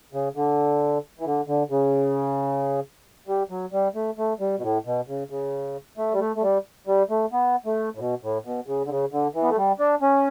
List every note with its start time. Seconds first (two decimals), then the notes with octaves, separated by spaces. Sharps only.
0.13 C#3
0.35 D3
1.19 E3
1.26 D3
1.47 D3
1.70 C#3
3.27 G3
3.50 F#3
3.72 G3
3.95 A3
4.18 A3
4.40 G3
4.58 B2
4.62 A2
4.85 B2
5.08 C#3
5.30 C#3
5.97 A3
6.13 G3
6.19 A3
6.36 A3
6.42 G3
6.87 G3
7.10 A3
7.32 B3
7.66 A3
7.95 A2
7.99 B2
8.22 A2
8.45 B2
8.67 C#3
8.85 D3
8.90 C#3
9.12 D3
9.34 E3
9.42 B3
9.50 A3
9.57 G3
9.79 D4
10.02 C#4